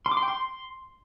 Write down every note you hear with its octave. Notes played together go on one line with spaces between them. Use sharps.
C6
D6
C6
G5
C6